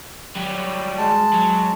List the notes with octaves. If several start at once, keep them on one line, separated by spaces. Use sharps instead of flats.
F#3 G3
G#3 A5
F#3